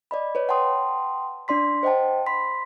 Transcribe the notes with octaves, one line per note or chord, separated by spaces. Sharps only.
D5 D#5 B5
B4 C#5
F#5 G5 A5 C6 D#6
D4 D5 C6 B6
C5 D#5 F#5 G5 A5
B5 C6 B6